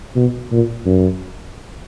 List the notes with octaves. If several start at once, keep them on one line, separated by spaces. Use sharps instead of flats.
B2
A#2
F#2